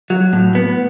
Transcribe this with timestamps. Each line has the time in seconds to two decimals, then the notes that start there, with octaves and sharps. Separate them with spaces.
0.10 F#3
0.33 A2
0.55 B3